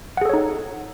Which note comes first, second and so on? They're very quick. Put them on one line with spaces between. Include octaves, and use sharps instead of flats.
F#5 G#4 A4 C#5 D#4